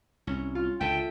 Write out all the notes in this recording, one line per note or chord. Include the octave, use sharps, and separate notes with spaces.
C2 C#4
F4
C#2 D3 A4 E5 G5